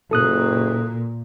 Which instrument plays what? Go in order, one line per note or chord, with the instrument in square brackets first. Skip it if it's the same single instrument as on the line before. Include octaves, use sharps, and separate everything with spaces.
[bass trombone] F#1 [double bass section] A#2 [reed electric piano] A4 D#6 F#6